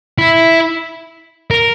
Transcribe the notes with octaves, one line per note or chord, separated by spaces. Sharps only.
E4
A#4